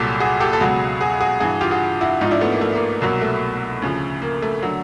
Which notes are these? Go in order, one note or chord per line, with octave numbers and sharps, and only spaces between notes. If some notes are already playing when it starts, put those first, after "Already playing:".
Already playing: C2 A#2 F#3 G4 A4
F#4 G#4
G4 A4
A4
C#2 B2 F#3 F#4 G#4
F#4 G#4
F#4 G#4
G2 E3 F#4 G#4
F4 G4
F#4 G#4
E4 F#4
G#2 F3 D#4 F4
D4 E4
A3 B3
A#3
A3
A#3
C2 B2 F#3 A#3
A3
D2 C#3 F3
A#3
A3
D3 F#3